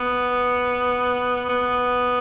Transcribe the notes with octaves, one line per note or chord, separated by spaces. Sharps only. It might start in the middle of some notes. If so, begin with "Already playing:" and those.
Already playing: B3
B3